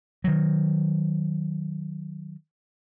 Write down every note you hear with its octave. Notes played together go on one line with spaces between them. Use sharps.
D#3 F#3